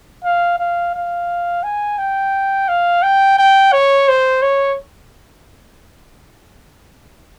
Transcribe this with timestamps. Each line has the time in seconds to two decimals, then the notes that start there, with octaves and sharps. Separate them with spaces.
0.24 F5
0.59 F5
0.94 F5
1.64 G#5
1.98 G5
2.69 F5
3.03 G5
3.38 G5
3.72 C#5
4.08 C5
4.42 C#5